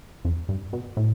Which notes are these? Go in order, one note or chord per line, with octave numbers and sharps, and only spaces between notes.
F2
G2
B2
A2